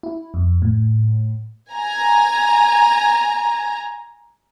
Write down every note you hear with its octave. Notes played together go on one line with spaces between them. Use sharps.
E4
F2
A2
G#5 A#5